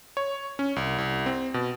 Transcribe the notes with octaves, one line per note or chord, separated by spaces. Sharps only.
C#5
C#4
C2
C2
C4
B2